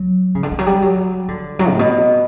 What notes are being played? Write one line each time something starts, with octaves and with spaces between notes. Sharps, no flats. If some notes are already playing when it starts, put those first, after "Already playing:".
Already playing: F#3
C#3
D3
E3
F#3
G3
F#3
D3
F#3
A2
B2